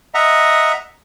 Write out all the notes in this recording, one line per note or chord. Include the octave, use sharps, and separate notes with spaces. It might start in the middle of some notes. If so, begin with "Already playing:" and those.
D#5 E5 F#5 A#5